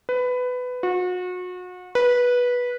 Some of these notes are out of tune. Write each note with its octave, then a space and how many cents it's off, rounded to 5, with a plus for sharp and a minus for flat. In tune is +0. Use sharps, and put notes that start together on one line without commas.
B4 +15
F#4 -35
B4 -15